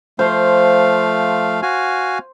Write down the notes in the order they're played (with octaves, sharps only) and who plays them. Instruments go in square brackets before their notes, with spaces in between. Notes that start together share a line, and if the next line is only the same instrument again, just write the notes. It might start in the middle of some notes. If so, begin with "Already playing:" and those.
[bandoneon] F3 A3 F5 [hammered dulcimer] C5
[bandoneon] F#4 F5 G#5